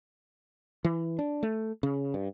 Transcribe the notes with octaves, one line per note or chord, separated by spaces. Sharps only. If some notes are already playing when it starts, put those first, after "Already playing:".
E3
D4
A3
C#3
G2